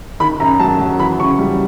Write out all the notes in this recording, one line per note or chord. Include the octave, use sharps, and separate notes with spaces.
D#3 B5
F#2 A#5
F#3 A5
F#3
E3 B5
C#3 C#6
G3